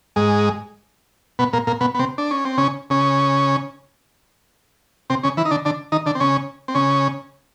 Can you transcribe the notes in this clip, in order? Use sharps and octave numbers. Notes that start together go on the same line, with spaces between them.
G#2 G#3
B2 B3
A#2 A#3
A#2 A#3
B2 B3
B3
C3 C4
D4
C#4
C4
C#3 C#4
C#3 C#4
C3 C4
C#3 C#4
E3 E4
D#4
D3 D4
D3 D4
D#3 D#4
D3 D4
C4
C#3 C#4
C4
C#3 C#4